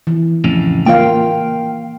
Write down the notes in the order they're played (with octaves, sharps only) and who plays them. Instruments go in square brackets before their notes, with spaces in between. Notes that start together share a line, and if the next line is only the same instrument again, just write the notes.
[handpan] E3
[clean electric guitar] F2 A2 C#3
[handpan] A#3 F4 F5 [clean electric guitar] G5